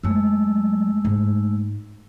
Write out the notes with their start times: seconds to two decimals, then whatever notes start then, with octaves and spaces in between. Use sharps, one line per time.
0.03 F#2 F#3 G#3 A3 E6
1.05 G#2